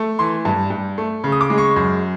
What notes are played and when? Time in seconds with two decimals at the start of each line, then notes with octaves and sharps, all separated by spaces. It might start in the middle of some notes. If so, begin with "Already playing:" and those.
Already playing: A3
0.19 E3 C6
0.45 G2
0.70 G2
0.98 A3
1.24 C#3
1.32 D#6
1.41 D6
1.50 G#3
1.58 C#6
1.76 F#2